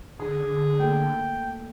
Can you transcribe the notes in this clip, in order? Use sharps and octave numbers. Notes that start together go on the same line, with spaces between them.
D3 G#4
A3 A#3 A4 G5